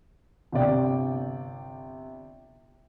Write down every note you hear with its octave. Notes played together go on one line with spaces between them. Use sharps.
G1 C3 D5 G5